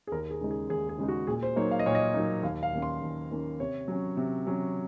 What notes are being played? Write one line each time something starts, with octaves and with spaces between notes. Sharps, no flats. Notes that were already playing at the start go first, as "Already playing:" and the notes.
G#4
D#2 A#4
G#4
C#3 G#3 D#4
G#4
D#2 G#4
G#4
C#3 G#3 D#4
F#4
A#2 G#4
C5
F#3 A#3 D#4 C#5
F5
D#5
A#2 C#5
D#5
F#3 A#3 D#4
D#2 F5
F5
D#3 A#3 C#4
C6
D#2
D#3 A#3 C#4
C3 C#5
F#3 C#4
C3
F#3 C#4